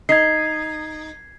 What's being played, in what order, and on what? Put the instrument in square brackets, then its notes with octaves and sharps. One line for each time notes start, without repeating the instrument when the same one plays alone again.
[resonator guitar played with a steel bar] D#4 [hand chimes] G#6 B6 C7